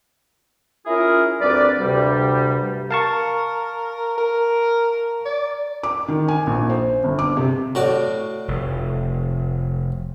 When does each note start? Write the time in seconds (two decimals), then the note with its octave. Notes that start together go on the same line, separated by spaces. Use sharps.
0.86 C#4 E4 F4 G#4 A#4
1.40 D2 G2 C4 A#4 B4 D5
1.79 D2 G2 C3 G3
2.91 A#4 F5 A5 C#6
4.18 A#4
5.26 D5
5.83 D6
6.08 D#3
6.28 G#5
6.47 A#1
6.70 C5
7.04 G1
7.19 D6
7.37 C3
7.75 A2 F#4 D5
8.48 F1